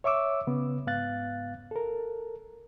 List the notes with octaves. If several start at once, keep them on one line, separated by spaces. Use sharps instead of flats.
C#5 E5 C#6 D6 E6
C#3 B3
G#2 B3 F5 F#6 A6
A4 A#4